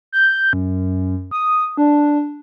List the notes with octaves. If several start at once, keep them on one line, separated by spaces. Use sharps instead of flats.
G6
F#2
D#6
D4